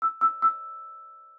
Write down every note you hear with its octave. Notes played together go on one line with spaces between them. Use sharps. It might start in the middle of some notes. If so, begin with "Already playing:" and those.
E6
E6
E6